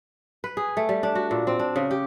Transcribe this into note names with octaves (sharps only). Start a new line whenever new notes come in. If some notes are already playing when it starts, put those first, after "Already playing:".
B4
G#4
A3
G3
D4
F#4
A#2
C4
D4
C#3
G4